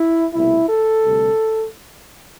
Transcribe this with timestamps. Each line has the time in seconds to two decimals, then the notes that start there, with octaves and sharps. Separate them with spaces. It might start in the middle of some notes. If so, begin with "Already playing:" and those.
Already playing: E4
0.34 C2 B2 A3 E4
0.69 A4
1.05 D2 C3 G3